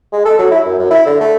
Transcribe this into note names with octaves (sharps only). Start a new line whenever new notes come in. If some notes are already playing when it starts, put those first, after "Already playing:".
G#3
A4
F#3
E4
F#2
F#2
E4
D3
A3